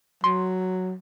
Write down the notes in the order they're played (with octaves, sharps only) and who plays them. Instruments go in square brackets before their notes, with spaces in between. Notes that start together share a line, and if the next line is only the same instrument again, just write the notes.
[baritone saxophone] F#3 [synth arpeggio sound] C6